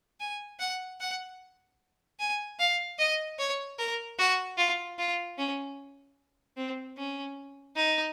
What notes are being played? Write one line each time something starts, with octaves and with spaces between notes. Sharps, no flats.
G#5
F#5
F#5
G#5
F5
D#5
C#5
A#4
F#4
F4
F4
C#4
C4
C#4
D#4